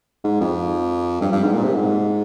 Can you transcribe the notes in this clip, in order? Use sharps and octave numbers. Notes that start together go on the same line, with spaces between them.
G#2
F2
G2
G2
G#2
A#2
C3
G#2